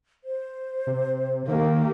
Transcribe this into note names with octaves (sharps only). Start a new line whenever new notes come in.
C5
C3
D#3 A#3 G4